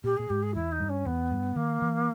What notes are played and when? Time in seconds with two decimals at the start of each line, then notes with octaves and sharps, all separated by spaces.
0.04 A#2 G4
0.17 A#2 G#4
0.30 G#2 G4
0.43 G#4
0.55 E2 E4
0.72 D#4
0.80 G2
0.89 C#4
1.05 E2 B3
1.31 G2
1.56 D#3 A#3
1.82 E3